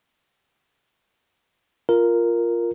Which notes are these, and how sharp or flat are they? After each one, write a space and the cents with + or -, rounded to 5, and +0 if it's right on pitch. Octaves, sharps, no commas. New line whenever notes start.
F4 -5 A#4 +0